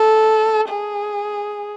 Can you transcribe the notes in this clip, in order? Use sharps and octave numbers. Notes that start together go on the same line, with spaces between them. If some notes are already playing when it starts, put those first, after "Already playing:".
Already playing: A4
G#4